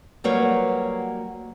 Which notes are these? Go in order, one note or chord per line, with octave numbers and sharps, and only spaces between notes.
F#3 G3 A#3 F#4 B4 C#5